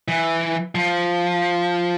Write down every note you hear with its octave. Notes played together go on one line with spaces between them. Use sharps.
E3
F3